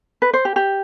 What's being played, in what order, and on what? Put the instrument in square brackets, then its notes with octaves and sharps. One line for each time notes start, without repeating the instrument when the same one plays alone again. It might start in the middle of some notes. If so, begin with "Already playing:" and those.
[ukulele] B4
C5
G4
G4